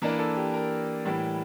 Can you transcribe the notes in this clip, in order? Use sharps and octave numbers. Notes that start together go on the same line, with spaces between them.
E3 A#3 D4 A#4
A4
G4
A#4
A2 E3 G3